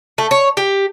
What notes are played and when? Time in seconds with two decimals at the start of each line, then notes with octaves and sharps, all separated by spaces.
0.18 A3
0.31 C#5
0.57 G4